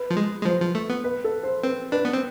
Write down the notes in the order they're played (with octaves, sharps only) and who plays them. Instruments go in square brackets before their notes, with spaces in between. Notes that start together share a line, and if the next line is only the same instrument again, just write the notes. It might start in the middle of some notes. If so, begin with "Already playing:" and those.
Already playing: [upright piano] B4
[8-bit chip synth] F3
G#3
G#3
[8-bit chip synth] F3 [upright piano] C5
[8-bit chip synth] F3
A3
B3
[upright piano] B4
A4
C5
[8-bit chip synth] C4 [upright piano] B4
[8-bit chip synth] D4 [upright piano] B4
[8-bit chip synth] B3
C4